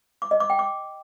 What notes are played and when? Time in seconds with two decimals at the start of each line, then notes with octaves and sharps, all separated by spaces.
0.22 D6
0.31 D#5
0.40 D6
0.50 G5
0.59 D6